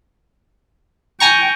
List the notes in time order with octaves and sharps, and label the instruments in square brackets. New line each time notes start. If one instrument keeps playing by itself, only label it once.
[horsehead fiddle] G5 [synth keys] G#5 A#5 C#6